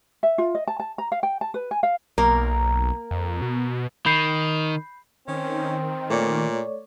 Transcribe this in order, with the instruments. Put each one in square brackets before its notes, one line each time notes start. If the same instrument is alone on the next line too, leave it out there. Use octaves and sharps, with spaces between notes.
[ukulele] E5
F4
D#5
A5
A5
A#5
F5
G5
A5
B4
G#5
F5
[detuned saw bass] B1 [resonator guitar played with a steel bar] A#3 A#4
[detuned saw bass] F2
B2
[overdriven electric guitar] D#3 [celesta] B5 G6 C7
[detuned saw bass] D#3 [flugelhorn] C4 [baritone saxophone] C#4
[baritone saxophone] A#2 [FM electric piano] A3 C#5 D5